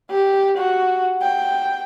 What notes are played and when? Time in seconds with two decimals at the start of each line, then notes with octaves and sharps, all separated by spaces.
0.10 G4
0.58 F#4
1.21 G5